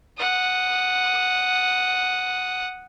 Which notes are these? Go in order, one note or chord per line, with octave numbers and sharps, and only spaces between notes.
F#5 D#6